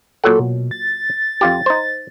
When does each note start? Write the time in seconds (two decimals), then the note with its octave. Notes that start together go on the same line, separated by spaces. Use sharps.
0.24 A#2 F#3 A4 F#5
0.40 B2
0.71 A6
1.41 F2 F4 G4
1.66 D#4 C5